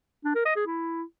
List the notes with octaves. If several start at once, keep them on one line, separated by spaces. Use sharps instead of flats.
D4
A#4
D#5
G#4
E4